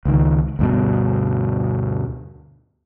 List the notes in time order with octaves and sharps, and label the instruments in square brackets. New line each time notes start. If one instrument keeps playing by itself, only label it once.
[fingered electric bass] C#2 D#3
D2 G2 B2